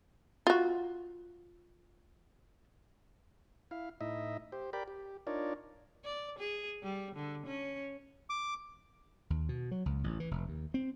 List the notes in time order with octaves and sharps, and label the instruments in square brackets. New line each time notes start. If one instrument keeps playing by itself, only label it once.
[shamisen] F4 F#4
[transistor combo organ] E4 F5
A2 D#4 E4 D#5 E5
G4 C5
G4 A#4 D5 G5 B5
G4
D4 D#4 F4 A#4 C#5 D5
[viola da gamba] D5
G#4
G3
D3
C#4
[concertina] D6
[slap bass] D#2
B2
F#3
C#2
A1
E3
F1
D#2
C4